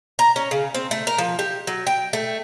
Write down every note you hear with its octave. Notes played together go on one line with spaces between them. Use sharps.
A#5
C#4
C#3
C4
A3
A#4
F3
G4
F#3
G5
A3